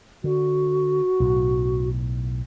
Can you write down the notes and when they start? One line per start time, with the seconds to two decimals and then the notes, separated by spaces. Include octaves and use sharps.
0.24 D3 F#4
1.20 B1 A2